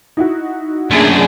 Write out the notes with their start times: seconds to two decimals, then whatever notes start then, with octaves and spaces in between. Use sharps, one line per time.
0.17 D#4 E4 F#4
0.90 F#2 A3 A#3 D4 G#4